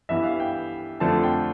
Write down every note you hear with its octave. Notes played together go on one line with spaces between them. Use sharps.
G2 E3 B3 E5
F5
G5
F2 D3 F3 A3 C4 A5
G5